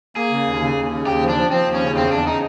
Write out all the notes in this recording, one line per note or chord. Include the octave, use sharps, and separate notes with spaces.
A#3 G#4
C#3
D#2
C#3
D#2
C#3
D#2 G4
F3
D4
F3
F3 C4
D#2
C#4
C#3
E2 C4
E2 D4
C#3 D#4